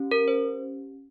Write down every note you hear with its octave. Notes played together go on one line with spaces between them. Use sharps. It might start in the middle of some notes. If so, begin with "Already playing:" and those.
Already playing: C#4 G4
A#4
C5